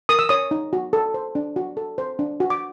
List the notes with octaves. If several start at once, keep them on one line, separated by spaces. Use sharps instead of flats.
A#4 D#6
E6
C#5 D#6
D#4
F#4
A4
C5
D4
F#4
A4
C5
D4
F#4
D6